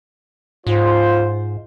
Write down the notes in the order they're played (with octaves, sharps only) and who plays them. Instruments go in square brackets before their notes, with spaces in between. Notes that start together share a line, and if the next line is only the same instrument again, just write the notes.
[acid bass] G#2 [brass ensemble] F4 C5